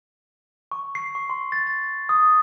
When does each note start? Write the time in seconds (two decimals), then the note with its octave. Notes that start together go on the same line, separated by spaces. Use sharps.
0.72 C#6
0.95 C7
1.15 C#6
1.30 C6
1.52 A6
1.67 A6
2.09 D#6